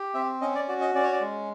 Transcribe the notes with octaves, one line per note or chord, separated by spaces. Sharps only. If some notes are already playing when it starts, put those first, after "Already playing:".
Already playing: G4
C4 E5
C#4 D#5
D5
F#4 D5
D#5
C#4 D5
C#5
D5
G#3